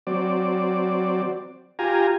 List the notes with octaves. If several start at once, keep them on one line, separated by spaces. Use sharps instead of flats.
F#3 C4 D5
F4 G4 G#5 A#5